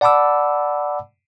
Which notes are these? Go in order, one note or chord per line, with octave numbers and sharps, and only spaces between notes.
D5 F#5 A5 B5 D6 E6